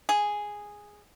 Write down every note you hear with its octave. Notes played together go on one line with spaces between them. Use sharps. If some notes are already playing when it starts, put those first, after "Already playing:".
G#4